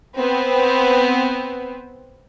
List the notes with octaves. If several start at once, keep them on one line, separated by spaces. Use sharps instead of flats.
B3 C4